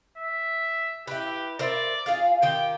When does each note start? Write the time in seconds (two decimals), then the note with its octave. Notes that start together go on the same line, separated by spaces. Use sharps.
0.18 E5
1.07 E4 G4 B4
1.59 A#4 C5 D5 E5
2.06 F4 G#4 F5
2.42 D#3 F4 G4 G5